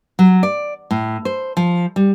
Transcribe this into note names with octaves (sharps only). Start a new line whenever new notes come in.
F#3
D5
A2
C5
F3
G3